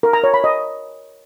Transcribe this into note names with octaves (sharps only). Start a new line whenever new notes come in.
A#4
A#5
C#5
B5
D#5